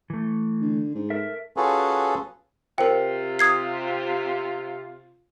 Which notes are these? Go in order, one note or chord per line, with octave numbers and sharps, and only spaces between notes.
E3 A3
D3
G#2
A4 A#4 E5
C#4 F4 F#4 G#4 A4 B4
C3 F4 A#4 C5 G5
D#6 G#6 C7